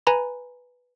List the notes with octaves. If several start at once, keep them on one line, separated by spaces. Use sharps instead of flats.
B4 G#5 A#5 B5